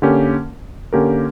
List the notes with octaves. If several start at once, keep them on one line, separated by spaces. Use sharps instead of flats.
D3 A#3 C#4 G4 A#4
D3 A#3 C#4 G4 A#4